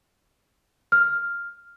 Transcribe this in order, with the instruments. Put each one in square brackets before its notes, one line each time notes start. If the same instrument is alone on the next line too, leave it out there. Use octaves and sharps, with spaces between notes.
[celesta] F6